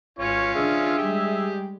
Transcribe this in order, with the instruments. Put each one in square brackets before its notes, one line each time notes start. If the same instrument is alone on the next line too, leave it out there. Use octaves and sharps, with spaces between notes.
[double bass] G#1 [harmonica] C#4 F4 [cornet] C#5
[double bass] D#3 D4 [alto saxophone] G#4 [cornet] E5
[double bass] G3 G#3 [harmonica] G4